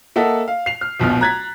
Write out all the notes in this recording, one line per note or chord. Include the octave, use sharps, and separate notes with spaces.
A#3 A4 D#5 E5 F#5 A5
F5
C7 F7
F6
D1 A#1 B2 F6
A#5 F#6 G#6 A6 B6